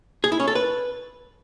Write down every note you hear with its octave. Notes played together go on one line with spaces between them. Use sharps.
G#4
E4
C#4
A4
B4